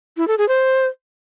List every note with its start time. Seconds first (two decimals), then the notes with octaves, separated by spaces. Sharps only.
0.17 E4
0.28 A4
0.38 G#4
0.48 C5